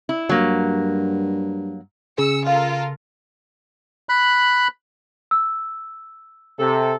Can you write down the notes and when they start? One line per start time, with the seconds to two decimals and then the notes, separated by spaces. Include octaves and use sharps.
0.09 E4
0.29 G2 F#3 A#3
2.18 C#3 G#4 E6 C#7
2.47 F4 A4 A#4 F5
4.09 B5 F#6
5.31 E6
6.59 C3 A4